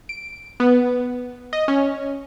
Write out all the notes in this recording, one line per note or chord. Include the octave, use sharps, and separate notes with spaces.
D7
B3
D#5
C#4